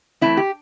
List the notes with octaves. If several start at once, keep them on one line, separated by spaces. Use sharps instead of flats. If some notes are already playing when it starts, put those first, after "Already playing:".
E3 A3 C4 E4
G4